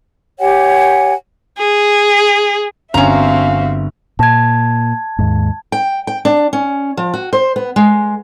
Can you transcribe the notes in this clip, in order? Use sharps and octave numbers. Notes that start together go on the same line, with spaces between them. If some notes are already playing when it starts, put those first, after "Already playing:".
G4 C#5 F#5 G#5
G#4
G1 C4 C#4 F#4 E5 F5 A#5 F7
A#2 A5 G#6
D#2 G#2
G5
G5
D4
C#4
F3
F#4
C5
B3
G#3